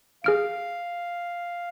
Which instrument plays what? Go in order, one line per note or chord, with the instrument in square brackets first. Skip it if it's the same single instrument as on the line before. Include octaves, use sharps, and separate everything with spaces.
[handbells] G#4 F6 D7 [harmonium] F5